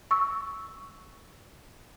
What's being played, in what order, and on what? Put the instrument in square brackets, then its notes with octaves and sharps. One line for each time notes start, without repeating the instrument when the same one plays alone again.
[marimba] C#6 E6